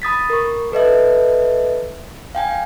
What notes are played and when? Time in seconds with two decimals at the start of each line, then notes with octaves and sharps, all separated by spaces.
0.02 B5 D#6 A6 B6
0.30 A#4 C#6
0.72 A4 B4 D#5 E5
2.35 F5 G5 G#5